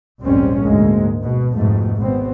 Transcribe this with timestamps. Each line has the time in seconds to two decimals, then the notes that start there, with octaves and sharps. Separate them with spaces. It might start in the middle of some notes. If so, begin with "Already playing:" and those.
0.22 A#1 D#2 G#2 G3 C4 C#4
0.62 D2 G#2 G#3 A#3
1.20 B2
1.55 F2 G#2 B2 A3
1.98 G#1 B2 B3 C4